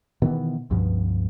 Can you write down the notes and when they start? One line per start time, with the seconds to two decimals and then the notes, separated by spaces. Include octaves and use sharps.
0.22 B2 D#3 E3 B3
0.70 C#2 G2 B2 F3